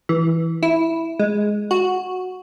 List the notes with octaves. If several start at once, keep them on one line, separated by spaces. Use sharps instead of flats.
E3
E4
G#3
F#4